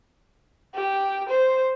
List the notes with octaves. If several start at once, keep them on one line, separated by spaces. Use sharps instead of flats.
G4
C5